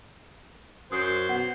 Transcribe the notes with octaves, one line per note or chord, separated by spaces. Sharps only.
F#2 C5 D#6 C7
B2 F#5